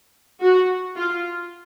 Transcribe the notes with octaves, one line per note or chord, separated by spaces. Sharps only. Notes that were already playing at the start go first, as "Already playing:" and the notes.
F#4
F4